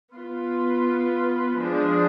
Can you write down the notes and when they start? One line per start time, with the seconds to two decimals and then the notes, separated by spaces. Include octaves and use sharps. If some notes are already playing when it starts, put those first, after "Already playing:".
0.14 B3 F4 B4
1.60 F3 G#3 D4 G#4